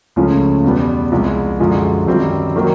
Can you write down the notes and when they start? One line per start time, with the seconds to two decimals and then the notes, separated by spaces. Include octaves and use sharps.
0.16 C#2 C#3 F3 A3 C#4
0.64 E2 B2 G3 B3
1.12 C2 C3 F3 G#3
1.59 F#2 D3 F3 G#3
2.07 F#2 D#3 G3 C4 F4
2.56 D#3 F#3 A#3